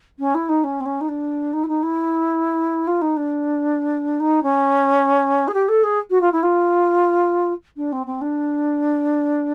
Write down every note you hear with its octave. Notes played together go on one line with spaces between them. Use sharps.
C#4
E4
D#4
C#4
C4
C#4
D#4
D4
D#4
E4
D#4
E4
F4
D#4
D4
D#4
C#4
G#4
G4
A4
G#4
F#4
F4
E4
F4
D4
C4
C4
D4